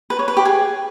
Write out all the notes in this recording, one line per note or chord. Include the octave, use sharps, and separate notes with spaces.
B4
C#5
B4
G4
G#4